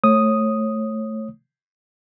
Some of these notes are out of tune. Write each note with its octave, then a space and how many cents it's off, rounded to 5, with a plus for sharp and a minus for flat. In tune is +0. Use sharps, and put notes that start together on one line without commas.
A3 +0 C#5 -25 D#6 +0